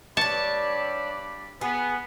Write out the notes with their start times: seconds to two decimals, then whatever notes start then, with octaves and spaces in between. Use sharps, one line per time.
0.17 G2 D4 C#5 D5 A5 B5
1.61 B3 G#4